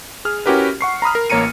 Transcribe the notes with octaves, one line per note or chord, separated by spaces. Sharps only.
G#4 F6
C#4 E4 F#4 G4 A#4 B4
F#5 C#6 C7
A#5 B5 D#6 F6
A#4
A1 A#3 C#5 A#5 C#7 D#7